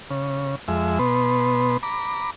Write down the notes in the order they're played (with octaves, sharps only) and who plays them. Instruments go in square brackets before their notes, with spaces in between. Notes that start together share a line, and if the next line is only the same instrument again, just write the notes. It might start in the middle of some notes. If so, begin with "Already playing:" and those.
[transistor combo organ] C#3
F2 G#3 E5
B2 B3 C6
A#5 B5 D6